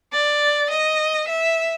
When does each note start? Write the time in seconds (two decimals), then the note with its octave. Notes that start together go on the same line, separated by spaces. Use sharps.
0.13 D5
0.71 D#5
1.28 E5